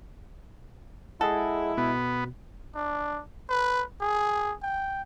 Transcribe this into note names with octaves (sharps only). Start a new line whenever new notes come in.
G#3 E4 G#4 A4 D#5 F#5
B2 B3
D4
B4
G#4
G5